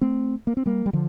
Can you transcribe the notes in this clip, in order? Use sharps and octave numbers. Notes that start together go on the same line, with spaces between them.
A3 C4
A#3
C4
G3 A#3
G3
D3 F3